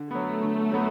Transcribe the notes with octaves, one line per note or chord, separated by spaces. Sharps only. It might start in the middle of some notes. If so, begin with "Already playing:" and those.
Already playing: D3
F#3 A3 B3
D3
F#3 B3